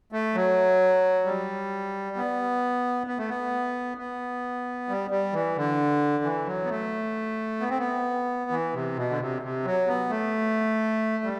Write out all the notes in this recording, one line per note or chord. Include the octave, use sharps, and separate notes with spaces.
A3
F#3
G3
B3
B3
A3
B3
B3
G3
G3
E3
D3
E3
F#3
B3
A3
B3
C4
B3
E3
C3
B2
D3
C3
C3
F#3
B3
A3
G3